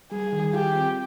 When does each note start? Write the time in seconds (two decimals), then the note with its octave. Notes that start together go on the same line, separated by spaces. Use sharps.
0.11 G3 G#4
0.32 D#3
0.53 F4 G4
0.76 C4